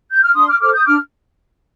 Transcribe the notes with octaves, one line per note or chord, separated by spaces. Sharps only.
G6
F6
D4 C6 D#6
D6 F6
A4 C5 D6 F6
D#6 G6
D4 D6 F6